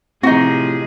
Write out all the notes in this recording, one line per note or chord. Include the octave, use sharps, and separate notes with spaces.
A2 C3 F3 C4 D#4 F#4 G#4